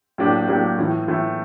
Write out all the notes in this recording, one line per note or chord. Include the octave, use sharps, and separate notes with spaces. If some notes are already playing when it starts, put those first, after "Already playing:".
A2 F#3 A#3 D4 G4
A2 F#3 A#3 D4 G4
A2 E3 A3
A2 E3 A3